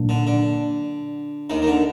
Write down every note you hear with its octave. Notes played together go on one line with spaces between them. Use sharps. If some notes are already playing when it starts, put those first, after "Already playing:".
Already playing: A#2 F#3 A#3 D4
D3
D3
D#2 D#3
D#3
D3